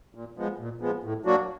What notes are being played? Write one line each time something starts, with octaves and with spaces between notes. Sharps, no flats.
A#2
F3 G#3 B3
A#2
F3 G#3 B3
A2
F#3 A#3 D4 F#4